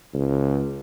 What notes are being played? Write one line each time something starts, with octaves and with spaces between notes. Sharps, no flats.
C#2